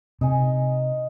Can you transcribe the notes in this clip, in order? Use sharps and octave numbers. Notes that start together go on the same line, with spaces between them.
C3 D#4 G#5